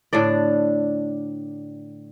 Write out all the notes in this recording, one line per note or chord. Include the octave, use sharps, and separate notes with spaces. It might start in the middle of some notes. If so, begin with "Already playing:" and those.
A2 D3 D4 D5